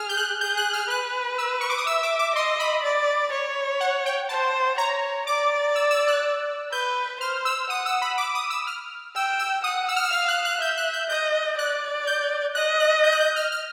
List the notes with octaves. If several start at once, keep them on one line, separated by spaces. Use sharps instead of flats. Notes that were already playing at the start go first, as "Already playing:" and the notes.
Already playing: G#4 F6
G6
F#6
G#4 G6
F#6
F6
B4 F#6
E6
C#6
D6
D#6
E5 E6
D6
D6
D#5 C6
B5
D5
C#5
F#5
G5
C5 A5
C#5 A#5
D5 D6
E6
E6
F#6
B4 G6
C5 F6
E6
F#5 D#6
E6
B5
D6
D#6
E6
F6
G5 E6
E6
F#5 D#6
E6
F6
E6
F5 F6
F#6
F#6
E5 G6
F#6
G6
D#5 G6
D5 F#6
G6
D#5 F#6
F#6
G6
F#6
G6
F6
F6